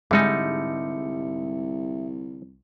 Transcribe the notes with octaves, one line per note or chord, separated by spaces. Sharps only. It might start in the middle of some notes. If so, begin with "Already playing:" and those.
C2 G#2 D3 G3 G#3 D#4 E5 C#7